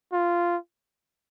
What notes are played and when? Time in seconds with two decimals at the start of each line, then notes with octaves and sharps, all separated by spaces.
0.13 F4